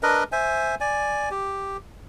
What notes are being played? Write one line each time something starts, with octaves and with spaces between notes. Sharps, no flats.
D4 A#4 B4 D#5
C5 E5 G#5
D5 G#5
G4